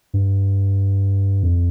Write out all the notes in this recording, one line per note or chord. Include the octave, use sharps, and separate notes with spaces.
G2
F2